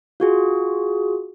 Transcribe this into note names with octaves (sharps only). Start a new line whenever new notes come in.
F4 F#4 G#4